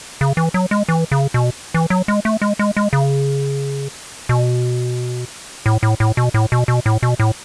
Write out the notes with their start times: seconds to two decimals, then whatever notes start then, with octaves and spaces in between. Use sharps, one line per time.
0.21 C#3
0.37 E3
0.54 F#3
0.71 G#3
0.89 E3
1.11 C#3
1.34 B2
1.74 E3
1.90 F#3
2.08 G#3
2.25 A3
2.42 G#3
2.59 G#3
2.77 G#3
2.93 C#3
4.29 B2
5.66 A2
5.83 A2
6.00 A2
6.17 B2
6.34 A2
6.52 B2
6.68 B2
6.86 A2
7.03 B2
7.20 A2